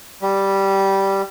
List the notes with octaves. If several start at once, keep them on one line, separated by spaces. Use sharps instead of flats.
G3